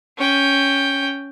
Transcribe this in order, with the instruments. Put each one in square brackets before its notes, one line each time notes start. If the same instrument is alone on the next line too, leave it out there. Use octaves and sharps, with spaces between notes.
[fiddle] C#4 G5